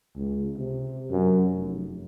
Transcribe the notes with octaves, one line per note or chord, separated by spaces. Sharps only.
C#2
C3
F#2
F1